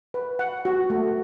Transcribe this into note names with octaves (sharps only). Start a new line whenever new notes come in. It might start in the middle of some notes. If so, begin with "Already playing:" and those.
B4
F#5
F#4
A3